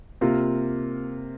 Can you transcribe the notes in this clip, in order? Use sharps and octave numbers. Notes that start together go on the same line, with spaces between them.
C3 A#3 F4